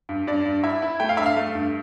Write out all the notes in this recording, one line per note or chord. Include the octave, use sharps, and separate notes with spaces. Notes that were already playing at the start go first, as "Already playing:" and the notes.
G2
G2 D5
G2
E4 E5
E4
A3 G5
F5
G2 E5
F5
A3
G2